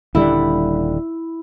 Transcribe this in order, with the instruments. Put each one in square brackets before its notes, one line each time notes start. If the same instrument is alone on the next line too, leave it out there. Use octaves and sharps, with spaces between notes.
[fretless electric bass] D#1 D3 G3 [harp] E4